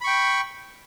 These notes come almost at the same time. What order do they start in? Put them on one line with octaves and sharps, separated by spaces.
B5 C#6 G5